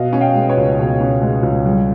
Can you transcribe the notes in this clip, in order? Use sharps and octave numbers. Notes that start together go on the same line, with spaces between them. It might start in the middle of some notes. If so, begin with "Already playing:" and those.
Already playing: B2 D#5 F5
C#4
F5 G5
G#3
B4 C#5
C#2
B2
C#4
G#3
C#2
G3